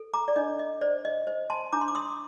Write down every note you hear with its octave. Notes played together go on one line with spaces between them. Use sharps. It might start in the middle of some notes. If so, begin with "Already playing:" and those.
Already playing: A4
A#5 D6
D5
D4 D#5
D#5
C5 D5
D#5
C5 D#5
A5 C6
D4 A#5 D6
C6
D6
C6 D#6